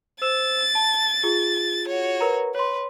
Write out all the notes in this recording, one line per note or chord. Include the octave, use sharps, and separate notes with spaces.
C5 E6 A6 E7
A5
F4 G#4
F#4 C#5
A#4 B4 A#5
B4 C#5 C6